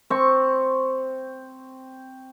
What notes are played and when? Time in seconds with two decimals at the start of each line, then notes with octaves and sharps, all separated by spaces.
0.10 C4 C#6